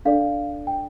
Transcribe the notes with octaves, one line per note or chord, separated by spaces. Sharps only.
D4 A4 D5 F5
G5